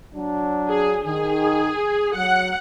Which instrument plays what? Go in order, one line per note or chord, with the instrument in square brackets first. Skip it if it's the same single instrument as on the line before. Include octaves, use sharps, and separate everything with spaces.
[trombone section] F#3 D4
[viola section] G#4
[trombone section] D#3 [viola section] G#4
[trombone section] F#3 [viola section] F#5